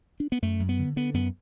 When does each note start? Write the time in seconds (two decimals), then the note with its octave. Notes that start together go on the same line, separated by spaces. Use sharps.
0.20 D4
0.32 B3
0.42 F#2 A3
0.60 F#2
0.69 B3
0.79 D3
0.96 D3 B3
1.14 F#2 B3